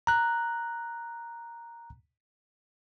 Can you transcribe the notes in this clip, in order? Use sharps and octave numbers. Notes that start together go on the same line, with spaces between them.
A#5 F#6